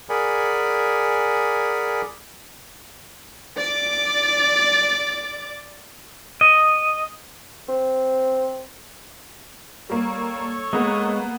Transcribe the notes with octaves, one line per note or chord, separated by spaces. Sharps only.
G#4 A#4 D5 F#5 G#5 B5
D5 D6
D#5
C4
G3 A#3 A4 C#5
G#3 A#3 B3